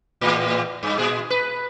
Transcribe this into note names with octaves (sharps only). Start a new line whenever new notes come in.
E2 A2
G2
A#2 G#4
B4